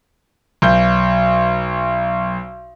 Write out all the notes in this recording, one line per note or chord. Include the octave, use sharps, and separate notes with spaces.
B1 G6